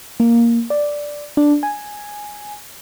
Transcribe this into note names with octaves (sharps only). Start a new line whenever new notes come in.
A#3
D5
D4
G#5